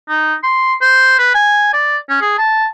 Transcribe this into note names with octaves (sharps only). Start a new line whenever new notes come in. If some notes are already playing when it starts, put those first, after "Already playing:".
D#4
C6
C5
B4
G#5
D5
C#4
G#4
A5